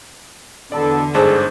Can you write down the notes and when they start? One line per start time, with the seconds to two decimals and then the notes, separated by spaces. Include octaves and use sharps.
0.72 E2 B2 D3 B3 A4 D5
1.15 G1 G#2 D4 G#4 A4 C5